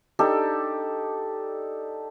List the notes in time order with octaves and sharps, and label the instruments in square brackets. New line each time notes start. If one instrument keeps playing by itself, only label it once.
[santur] D4 D#4 G4 A4